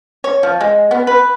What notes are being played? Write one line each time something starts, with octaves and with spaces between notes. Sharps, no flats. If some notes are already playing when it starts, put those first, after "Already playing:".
C#5
F3
G#3
B3
B4